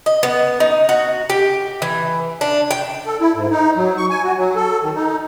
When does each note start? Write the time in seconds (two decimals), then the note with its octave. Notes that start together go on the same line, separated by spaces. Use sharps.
0.06 D#5
0.23 B3
0.60 D#4
0.89 F#4
1.30 G4
1.82 E3
2.41 D4
2.71 G5
3.06 A4
3.20 E4
3.34 G#2
3.51 D#4
3.77 F#3
3.97 C#6
4.10 G#5
4.24 F#4
4.37 F#3
4.56 A4
4.83 D#3
4.95 D#4